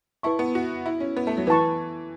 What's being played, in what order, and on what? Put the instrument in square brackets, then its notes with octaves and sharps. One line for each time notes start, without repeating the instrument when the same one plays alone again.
[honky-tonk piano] E4 [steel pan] B4 A5 C#6
[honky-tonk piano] B3
F#4
E4
C#4
B3
A3
F#3
[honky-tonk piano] E3 [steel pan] B4 A5 C#6